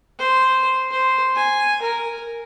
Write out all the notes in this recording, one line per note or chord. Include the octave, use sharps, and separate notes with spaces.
C5
C5
G#5
A#4